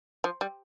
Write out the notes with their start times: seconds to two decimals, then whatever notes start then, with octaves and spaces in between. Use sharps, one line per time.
0.24 F3
0.41 G3